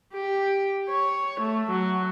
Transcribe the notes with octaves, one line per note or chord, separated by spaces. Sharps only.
G4
C#5
A3
F#3